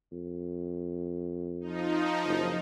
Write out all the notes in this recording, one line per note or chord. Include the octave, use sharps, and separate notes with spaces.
F2
F3 D#4
F#1